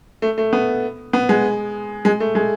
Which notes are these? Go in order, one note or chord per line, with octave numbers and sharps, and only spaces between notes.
A3
A3
B3
B3
G#3
G#3
A3
G#3